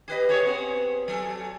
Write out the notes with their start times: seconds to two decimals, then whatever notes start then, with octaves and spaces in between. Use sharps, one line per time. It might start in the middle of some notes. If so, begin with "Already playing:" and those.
0.08 G4 B4 D#5
0.29 G4 G#4 C#5
0.45 B3 C4 G#4
1.08 F#3 A4